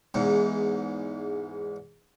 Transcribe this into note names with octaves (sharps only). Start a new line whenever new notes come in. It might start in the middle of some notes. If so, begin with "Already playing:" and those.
E2 G#2